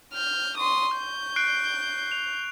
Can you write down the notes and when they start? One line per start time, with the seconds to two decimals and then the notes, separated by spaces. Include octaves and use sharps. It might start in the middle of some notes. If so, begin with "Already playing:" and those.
0.13 F6 G6
0.58 C6 C#6 D#6
0.97 G6
1.36 F#6 C7 D7
2.11 F7